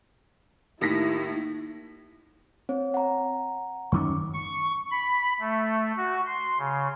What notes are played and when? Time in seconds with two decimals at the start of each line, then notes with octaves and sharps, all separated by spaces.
0.81 D#2 A2 E4 A#6 B6
2.69 C4 C#5
2.94 F#5 A#5
3.92 F#2 D#3 C#4 C#6 D6
4.34 C#6
4.91 B5
5.40 A3
5.97 F#4
6.26 C6
6.58 C#3